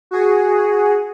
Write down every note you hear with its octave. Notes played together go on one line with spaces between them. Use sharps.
F#4 G#4